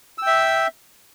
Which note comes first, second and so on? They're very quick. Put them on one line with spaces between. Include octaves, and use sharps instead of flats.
E6 G5 E5